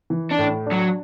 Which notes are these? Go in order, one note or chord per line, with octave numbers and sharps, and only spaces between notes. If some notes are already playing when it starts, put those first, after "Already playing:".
E3
D4
A2
D4
F#3